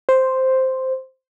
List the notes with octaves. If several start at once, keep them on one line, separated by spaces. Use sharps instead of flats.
C5